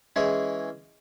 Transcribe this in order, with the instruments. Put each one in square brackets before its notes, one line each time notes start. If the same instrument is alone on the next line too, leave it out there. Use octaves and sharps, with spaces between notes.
[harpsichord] E3 G#3 C#4 E4 G#4